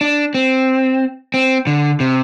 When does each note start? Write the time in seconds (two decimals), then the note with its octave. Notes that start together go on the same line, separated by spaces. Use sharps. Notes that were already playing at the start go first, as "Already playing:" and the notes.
0.01 D4
0.34 C4
1.34 C4
1.67 D3
2.00 C3